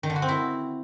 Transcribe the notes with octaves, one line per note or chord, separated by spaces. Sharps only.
D#3
D3
F#4
C4
E4